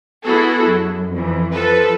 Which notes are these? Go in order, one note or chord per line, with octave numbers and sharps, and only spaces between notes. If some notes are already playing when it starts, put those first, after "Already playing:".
B3 E4 F#4 G#4 A4
F#2
F2 E3
F3 A4 B4